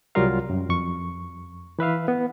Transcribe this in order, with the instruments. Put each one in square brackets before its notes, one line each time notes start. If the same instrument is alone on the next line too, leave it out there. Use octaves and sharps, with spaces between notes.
[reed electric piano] C2 F#3 G3 F4 A#4 F5
F#2
F2 C#6
E3 B4 E5 F5
B3